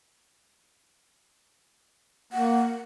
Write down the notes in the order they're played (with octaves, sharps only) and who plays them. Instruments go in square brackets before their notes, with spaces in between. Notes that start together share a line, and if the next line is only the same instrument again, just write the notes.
[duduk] A#3 [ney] F#5